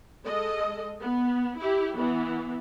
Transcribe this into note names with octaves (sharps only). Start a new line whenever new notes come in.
G#3 A4 D#5
B3
E4 G4
E3 B3